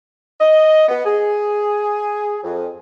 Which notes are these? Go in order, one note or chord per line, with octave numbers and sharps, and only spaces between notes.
D#5
B3
G#4
F2